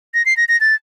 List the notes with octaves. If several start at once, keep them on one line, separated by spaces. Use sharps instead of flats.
A#6
C7
A#6
A#6
A6